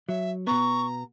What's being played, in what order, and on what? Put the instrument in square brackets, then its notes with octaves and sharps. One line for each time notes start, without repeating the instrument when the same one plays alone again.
[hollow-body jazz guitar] F#3 [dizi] E5
[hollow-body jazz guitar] B2 B3 [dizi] A#5 [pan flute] C#6